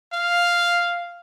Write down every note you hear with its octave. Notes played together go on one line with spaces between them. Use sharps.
F5